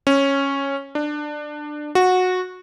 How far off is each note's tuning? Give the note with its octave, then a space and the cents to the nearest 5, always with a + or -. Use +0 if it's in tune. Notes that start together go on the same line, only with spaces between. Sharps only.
C#4 -10
D4 +20
F#4 -15